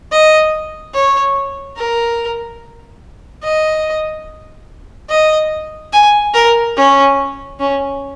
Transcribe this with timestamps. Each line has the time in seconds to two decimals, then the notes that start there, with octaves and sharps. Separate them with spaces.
0.11 D#5
0.94 C#5
1.77 A#4
3.43 D#5
5.09 D#5
5.93 G#5
6.34 A#4
6.76 C#4
7.59 C#4